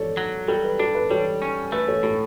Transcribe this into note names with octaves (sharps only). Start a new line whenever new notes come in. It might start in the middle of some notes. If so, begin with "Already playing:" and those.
Already playing: A4 C#5 D5
F#3
G3 A4
B4
D4 A4
B4
G3 A4 C#5
C#4
A3 B4
A4 C#5
A2 A4